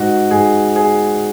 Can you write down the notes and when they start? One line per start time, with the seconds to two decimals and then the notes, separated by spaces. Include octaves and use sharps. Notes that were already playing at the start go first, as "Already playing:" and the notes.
Already playing: G#2 F#4
0.31 G#2 G#4
0.76 G#4